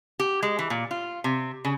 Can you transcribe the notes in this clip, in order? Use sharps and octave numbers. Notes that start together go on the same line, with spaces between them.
G4
G#3
E3
A#2
F4
C3
C#3